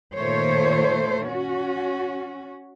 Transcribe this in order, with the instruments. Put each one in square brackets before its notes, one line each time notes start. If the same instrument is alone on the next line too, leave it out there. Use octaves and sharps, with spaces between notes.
[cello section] A#2 D#3 A3 C5 C#5
C#4 F#4